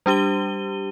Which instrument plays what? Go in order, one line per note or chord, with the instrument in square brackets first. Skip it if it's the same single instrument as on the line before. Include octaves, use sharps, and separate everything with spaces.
[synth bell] G3 D4 G4 D#7 G7